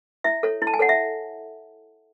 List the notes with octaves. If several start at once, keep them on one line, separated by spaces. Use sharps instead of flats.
E4 E5
A4 C#5
E4
A5
G#5
A4 C#5 F#5
E5